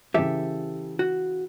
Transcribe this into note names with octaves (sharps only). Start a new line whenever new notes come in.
C#3 E3 G4 A4 E5
F#4